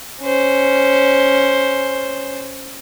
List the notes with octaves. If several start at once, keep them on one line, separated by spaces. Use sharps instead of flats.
C#4 C5